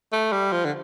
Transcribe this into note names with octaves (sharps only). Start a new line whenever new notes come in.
A3
G3
F3
D3